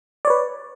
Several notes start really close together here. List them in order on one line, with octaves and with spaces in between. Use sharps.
D5 C#5 B4